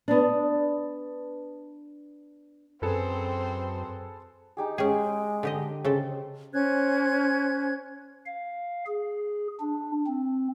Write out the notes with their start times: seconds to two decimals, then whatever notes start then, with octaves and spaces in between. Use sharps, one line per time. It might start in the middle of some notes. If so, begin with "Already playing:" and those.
0.08 B3 D4
2.82 F#2 C4 G#4 A4 B4 C5
4.57 D#4 G4 G#4
4.78 G#3 C#4 G#4 G5
5.43 D3 G4 D#5
5.85 C#3 A4 C5
6.53 C#4 C5 F#6 G#6
8.26 F5
8.87 G#4
9.60 D4
10.07 C4